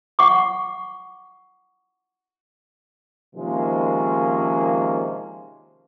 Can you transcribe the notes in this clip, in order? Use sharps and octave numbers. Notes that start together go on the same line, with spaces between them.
F#5 C#6 D6
C3 D#3 F3 G#3 A#3 C#4